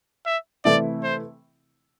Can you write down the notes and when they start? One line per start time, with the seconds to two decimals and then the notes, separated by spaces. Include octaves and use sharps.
0.26 E5
0.65 C3 E3 A3 C4 E4 D5
1.04 C5